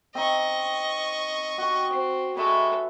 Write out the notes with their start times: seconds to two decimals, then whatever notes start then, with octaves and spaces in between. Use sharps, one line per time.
0.15 C4 D#4 D#5 C#6
1.58 F#4 G5
1.92 C4
2.37 G#3 A4 B4 C#5 E5